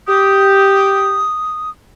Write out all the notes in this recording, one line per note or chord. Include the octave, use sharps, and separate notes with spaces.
G4 D#6